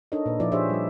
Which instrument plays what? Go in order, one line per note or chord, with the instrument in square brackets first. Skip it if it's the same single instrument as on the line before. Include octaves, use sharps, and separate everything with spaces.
[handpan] D4 D#4 A4 A#4 C#5 D#5
A#2 B4
F3 E4 F4 B4 D5
D4 G4 G#4 C5 C#5 E5
G3 F4